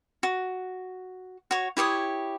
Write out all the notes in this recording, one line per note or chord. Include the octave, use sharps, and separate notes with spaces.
F#4
F#4 C#5
E4 G4 C#5 D#6